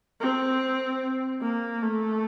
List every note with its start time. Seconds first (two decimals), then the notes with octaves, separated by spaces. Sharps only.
0.20 C4
1.41 A#3
1.82 A3